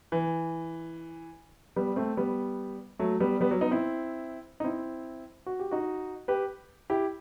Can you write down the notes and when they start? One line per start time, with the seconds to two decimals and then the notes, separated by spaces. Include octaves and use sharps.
0.12 E3
1.76 G3 B3
1.96 A3 C4
2.17 G3 B3
2.99 F#3 A3
3.20 G3 B3
3.41 G3 B3
3.51 F#3
3.61 B3 D#4
3.71 C4 E4
4.60 D#4
4.64 C4 E4
5.46 F#4
5.60 G4
5.71 D#4 F#4
6.28 G4 B4
6.90 E4 G4